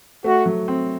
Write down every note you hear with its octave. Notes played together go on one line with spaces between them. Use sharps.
A3 F#4
F#3
C4